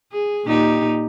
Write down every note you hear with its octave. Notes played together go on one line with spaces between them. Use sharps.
G#4
A#2 D#4 G4